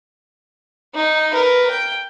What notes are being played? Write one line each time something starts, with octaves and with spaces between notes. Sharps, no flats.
D#4
A#4 B4
G5